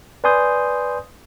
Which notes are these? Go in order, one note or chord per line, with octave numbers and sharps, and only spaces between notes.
B4 D5 G#5 C6 D#6 G6